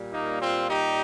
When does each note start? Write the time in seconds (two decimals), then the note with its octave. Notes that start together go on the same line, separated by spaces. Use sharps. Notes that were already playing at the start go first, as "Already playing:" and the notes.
Already playing: A#2 G3
0.11 A#3 D#4
0.40 C4 F4
0.70 D#4 G4